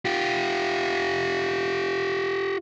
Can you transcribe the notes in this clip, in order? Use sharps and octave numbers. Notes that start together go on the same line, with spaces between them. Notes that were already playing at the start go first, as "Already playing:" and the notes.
F4 G4